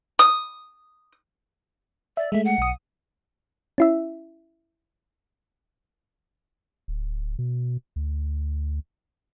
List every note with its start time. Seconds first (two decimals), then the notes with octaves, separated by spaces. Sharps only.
0.19 D#6
2.17 D5 E5
2.32 G#3 A3 E5
2.45 F#5
2.58 B1 D#6
3.78 C#4 E4 E5
6.88 D1
7.39 B2
7.96 D2